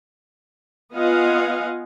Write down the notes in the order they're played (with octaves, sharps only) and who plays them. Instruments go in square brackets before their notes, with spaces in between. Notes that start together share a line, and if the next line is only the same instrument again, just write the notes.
[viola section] B3 F4 D#5 F5 F#5 G#5